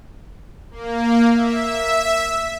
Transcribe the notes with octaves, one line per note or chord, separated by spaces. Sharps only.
A#3
E5